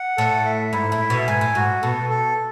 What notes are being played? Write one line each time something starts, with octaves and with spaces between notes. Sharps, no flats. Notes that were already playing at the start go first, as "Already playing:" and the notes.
Already playing: F#5
A2 A4
E5
G#2 E4
A2
E5
B2
G#2 G#5
A2
G#2 F#4
B2 A4
A4